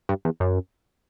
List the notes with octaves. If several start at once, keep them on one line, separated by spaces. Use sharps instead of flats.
G2
E2
F#2